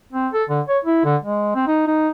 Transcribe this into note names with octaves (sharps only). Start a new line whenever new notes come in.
C4
A4
D3
C#5
E4
D3
G#3
C4
D#4
D#4